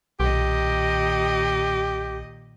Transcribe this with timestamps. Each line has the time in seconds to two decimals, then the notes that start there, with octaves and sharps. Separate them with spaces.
0.20 B1 A#2 D#3 G4 D#5